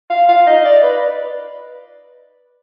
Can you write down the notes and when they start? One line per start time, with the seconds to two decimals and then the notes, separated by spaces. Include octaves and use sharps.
0.10 F5
0.28 F5
0.47 D#5
0.65 D5
0.83 B4